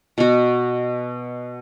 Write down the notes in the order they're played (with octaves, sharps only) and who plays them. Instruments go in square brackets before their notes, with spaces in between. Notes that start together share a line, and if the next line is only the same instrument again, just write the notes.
[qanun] B2 F#4